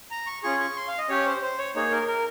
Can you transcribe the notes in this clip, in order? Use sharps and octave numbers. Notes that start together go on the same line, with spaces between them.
A#5
C#6
C#4 F4 G#4 C#6
C#6
C6
F5
D#5
C#4 G4 C#5
C5
C5
C#5
A#3 D#4 G#4 C#5
A#4
A#4